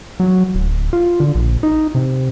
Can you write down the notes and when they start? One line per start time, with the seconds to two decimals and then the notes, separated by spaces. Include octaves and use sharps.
0.20 F#3
0.54 D1
0.93 F4
1.20 D3
1.35 A#1
1.63 D#4
1.95 C3